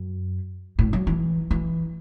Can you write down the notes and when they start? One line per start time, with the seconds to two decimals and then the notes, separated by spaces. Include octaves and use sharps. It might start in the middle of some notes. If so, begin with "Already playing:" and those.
Already playing: F#2
0.79 A2
0.93 F#3
1.07 E3
1.51 E3